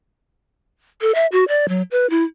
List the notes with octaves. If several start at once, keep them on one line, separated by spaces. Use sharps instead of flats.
A4
E5
F#4
D5
F#3
B4
E4